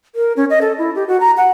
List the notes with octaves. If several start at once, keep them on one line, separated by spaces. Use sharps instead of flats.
A#4
C#4
D#5
A4
E4
G4
F#4
A#5
F#5